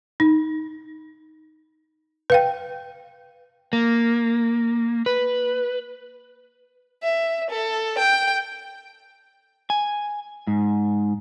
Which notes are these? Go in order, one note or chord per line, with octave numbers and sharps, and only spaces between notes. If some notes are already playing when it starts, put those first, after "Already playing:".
D#4
B4 F5 G5
A#3
B4
E5
A4
G5
G#5
G#2